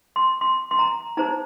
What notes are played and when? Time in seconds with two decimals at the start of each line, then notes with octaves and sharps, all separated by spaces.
0.16 C6
0.41 C6
0.71 C6
0.79 A#5
1.17 D#4 C5 A#5